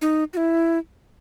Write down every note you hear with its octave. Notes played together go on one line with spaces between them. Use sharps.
D#4
F#4
E4